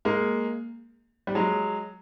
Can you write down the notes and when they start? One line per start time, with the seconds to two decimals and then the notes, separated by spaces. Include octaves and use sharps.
0.05 G#3 A#3
1.27 G3
1.35 F#3 G#3